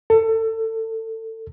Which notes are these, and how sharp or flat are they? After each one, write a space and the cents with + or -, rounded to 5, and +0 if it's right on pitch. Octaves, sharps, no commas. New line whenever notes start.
A4 +25